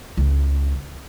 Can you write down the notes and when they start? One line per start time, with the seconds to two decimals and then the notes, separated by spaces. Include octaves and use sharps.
0.17 C#2